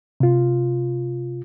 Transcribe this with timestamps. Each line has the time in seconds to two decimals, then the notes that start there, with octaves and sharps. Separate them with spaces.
0.20 C3 F4